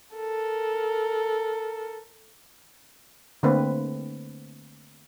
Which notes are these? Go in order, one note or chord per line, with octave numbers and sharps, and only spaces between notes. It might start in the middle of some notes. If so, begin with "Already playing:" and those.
A4 A#4
D3 A3 A#3 C4 B4